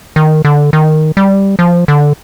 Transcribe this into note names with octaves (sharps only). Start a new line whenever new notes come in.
D#3
D3
D#3
G3
F3
D3